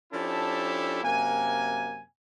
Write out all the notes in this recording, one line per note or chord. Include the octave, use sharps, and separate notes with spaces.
F3 C#4 D4 E4 G4 A4
F#2 C3 A#3 G#5